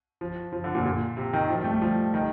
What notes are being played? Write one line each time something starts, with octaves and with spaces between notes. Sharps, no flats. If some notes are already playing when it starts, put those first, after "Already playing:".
F3
F3
D3
A#2
A#2
C3
D#3
F3
G3
A3
G3
F3
D#3